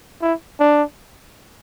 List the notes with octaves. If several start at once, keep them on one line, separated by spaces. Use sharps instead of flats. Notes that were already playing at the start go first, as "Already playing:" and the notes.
E4
D4